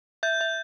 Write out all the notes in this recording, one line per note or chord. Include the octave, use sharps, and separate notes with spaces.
E5 G6
E5